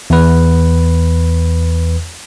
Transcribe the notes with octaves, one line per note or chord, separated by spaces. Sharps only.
E2 B4